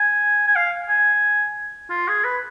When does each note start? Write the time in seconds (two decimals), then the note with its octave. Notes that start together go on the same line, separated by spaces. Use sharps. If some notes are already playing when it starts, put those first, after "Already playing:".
Already playing: G#5
0.47 G#5
0.56 F5
0.89 G#5
1.90 F4
2.08 G#4
2.24 B4